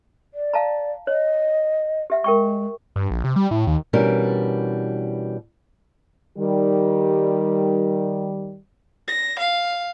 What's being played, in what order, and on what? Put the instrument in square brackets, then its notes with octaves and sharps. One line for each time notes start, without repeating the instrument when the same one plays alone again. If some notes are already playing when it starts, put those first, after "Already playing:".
[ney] D5
[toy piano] F5 A5 A#5
[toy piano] C#5 [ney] D#5
[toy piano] G4 E5 F#5
[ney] G#3 [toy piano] A#4 G5 C#6
[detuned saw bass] G2
A#1
C3
G3
A2
D#2
[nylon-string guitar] B2 E3 G3 C#4 D4 A#4
[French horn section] D#3 G3
[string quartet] A#6
F5